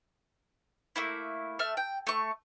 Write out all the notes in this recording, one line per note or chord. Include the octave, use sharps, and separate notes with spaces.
A3 A#3 E4
A3 E5 F6
G5
A3 C#6